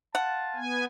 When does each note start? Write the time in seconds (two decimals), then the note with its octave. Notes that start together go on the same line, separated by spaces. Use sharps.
0.15 F4 F#5 A5
0.56 B3 G#5